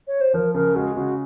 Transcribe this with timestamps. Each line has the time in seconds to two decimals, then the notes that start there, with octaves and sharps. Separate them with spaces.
0.08 C#5
0.21 C5
0.34 F3 A#4
0.54 C#3 A#4
0.76 G#3 F#4
0.96 C#3 F#4